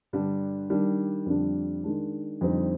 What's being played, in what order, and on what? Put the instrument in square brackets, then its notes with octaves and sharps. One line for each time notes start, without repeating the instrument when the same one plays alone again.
[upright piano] G2 D3 G3 D4
D#3 G3 D4
F2 D3 G3 D4
D#3 G#3 D4
F2 D3 G3 C4 D#4